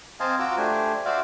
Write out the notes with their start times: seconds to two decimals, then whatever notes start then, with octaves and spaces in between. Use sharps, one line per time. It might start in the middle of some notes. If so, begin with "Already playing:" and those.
0.20 C4 C5 D#5 F5 G#5 A5
0.39 F4 F#4 A#5 D6 E6
0.57 A3 D4 G4 C5 G#5
1.05 F#4 C5 D5 E5 F5